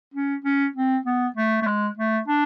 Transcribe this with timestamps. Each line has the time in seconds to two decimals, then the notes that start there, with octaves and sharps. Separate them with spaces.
0.14 C#4
0.45 C#4
0.76 C4
1.06 B3
1.36 A3
1.62 A3
1.67 G#3
1.97 A3
2.28 D4